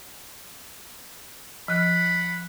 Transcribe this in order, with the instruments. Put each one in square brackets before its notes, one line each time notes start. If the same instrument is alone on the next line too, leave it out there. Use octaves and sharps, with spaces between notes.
[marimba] F3 F#6 [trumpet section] F#5 B5